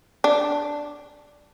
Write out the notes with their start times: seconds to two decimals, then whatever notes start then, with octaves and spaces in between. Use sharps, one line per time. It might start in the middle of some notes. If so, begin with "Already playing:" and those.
0.24 D4